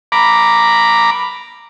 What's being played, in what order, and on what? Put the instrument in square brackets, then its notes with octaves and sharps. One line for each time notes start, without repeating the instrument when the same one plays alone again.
[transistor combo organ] A#5 B5 D6